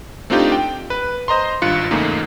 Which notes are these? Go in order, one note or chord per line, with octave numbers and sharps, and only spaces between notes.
A3 C4 D4 D#4 F4 G4
G5
B4
C5 D#5 A#5 C6
G#1 G2 F4 F#6 C#7
E2 G#2 C#3 A3 A#3 D#4